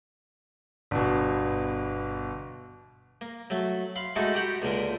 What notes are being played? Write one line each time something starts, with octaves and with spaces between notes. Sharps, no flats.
G1 B2
A#3
F#3 A3
F5 B5 C6
G#3 A3 D#4 E4 F#4 A4
F#4 G4 F#5 G5 B5
C#2 A#2 D3 A#4